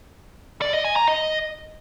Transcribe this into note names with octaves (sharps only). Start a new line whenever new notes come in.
D5
D#5
G#5
A#5
D#5